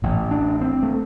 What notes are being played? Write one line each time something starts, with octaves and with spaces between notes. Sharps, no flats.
A1 A2
D4
C4
A3